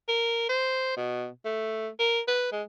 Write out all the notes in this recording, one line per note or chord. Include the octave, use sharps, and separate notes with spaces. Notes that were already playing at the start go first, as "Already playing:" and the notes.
A#4
C5
B2
A3
A#4
B4
G#3